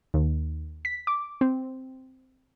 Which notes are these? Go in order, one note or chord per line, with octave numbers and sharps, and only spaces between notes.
D#2
B6
D6
C4